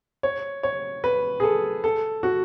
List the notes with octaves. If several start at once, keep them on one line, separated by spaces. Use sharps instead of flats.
C#5
C#5
B4
G#4
A4
A4
F#4